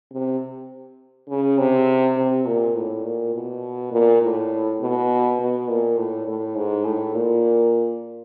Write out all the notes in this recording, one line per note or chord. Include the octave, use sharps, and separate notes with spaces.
C3
C#3
C3
C3
A#2
A2
A#2
B2
A#2
A2
B2
B2
A#2
A2
A2
G#2
A2
A#2